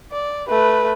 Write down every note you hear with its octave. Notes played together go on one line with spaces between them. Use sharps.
D5
A3 B4